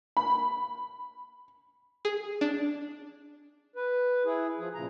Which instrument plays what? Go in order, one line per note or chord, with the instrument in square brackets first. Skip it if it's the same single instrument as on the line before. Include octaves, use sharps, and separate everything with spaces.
[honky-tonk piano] B5
[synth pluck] G#4
D4
[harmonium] B4
E4 G#4
F3 G#4
A#2 C#3 A#5